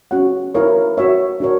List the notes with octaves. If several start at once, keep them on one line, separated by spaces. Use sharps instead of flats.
C#4 F#4 C#5 F#5
E4 A#4 C#5
F#4 C#5 E5
D4 F#4 A#4 C#5